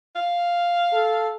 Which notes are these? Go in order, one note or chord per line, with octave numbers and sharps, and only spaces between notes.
F5
A4